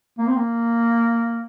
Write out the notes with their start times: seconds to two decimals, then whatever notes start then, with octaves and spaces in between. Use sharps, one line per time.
0.18 A#3
0.27 C4
0.36 A#3